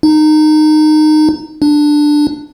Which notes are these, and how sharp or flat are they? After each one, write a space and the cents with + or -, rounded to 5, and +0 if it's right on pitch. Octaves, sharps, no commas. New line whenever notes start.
D#4 -20
D4 +10